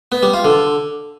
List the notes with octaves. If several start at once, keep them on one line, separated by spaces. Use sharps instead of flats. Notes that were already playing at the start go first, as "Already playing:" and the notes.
B3
G3
F4
D3